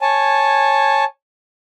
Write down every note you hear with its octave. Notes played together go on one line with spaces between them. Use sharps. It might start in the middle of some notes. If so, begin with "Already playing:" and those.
C#5 G#5 A5